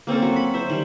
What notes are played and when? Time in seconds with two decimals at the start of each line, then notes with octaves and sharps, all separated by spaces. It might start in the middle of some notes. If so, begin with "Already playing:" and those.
0.07 A#3 C4 C#4 A4
0.22 F#3
0.36 B5
0.54 C5 E5
0.70 D#3 G3